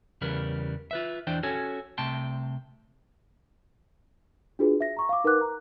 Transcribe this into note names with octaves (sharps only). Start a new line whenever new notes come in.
E2 C#3 G3 A#4 B4
F4 B4 E5
E2 E3 D4 C5 D5 G5
C#4 F#4 A4 C#5 G#5
C2 C3 A3 G5 A5 C6
D4 F4 F#4 G#4 B4
E5 A#6
A#5 C#6
F5 D6
D#4 A#4 B4 F#5 D6 F#6
A#5